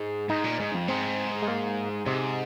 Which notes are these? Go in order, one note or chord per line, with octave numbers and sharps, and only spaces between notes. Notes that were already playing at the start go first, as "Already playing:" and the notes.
Already playing: G#2
G#2 D#4
A#2
G#2
F2
G#2 C4
G#3
A#3
G#2 C3